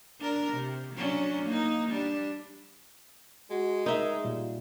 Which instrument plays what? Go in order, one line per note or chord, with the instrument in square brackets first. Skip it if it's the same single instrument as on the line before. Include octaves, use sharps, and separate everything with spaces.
[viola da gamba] D4 A#4
C3
F#3 C#4 D4
A#3 D#4
G3 D4
[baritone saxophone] G#3 [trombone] F#4
[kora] D#4 E5 [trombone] A#4
[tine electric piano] A#2 G3 [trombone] F4